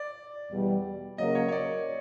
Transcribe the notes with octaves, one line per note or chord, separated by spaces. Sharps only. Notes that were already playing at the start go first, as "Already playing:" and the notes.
Already playing: D5
E2 B2 G3
C#3 F#3 A#3 D#5
C#5
C#5
D5